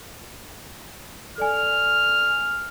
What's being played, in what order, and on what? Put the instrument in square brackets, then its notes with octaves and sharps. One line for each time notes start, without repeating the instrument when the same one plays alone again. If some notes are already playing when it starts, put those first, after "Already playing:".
[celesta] A4 D5 G#5 [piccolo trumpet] F6